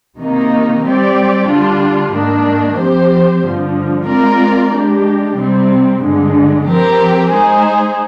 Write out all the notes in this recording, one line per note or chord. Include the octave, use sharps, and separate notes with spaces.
C3 D#3 A#3 D#4
G3 C4 G4 D5
D3 G3 D4 F4
G#2 D#3 A#3 D4
F3 C4 G4 C5
G2 D3 F3
G#3 C4 F4 A#4 D5
G#3 D4 G4
C3 G3 C4
G2 D3 G#3
F3 C4 G4 A#4
G#3 D#4 G#4 C5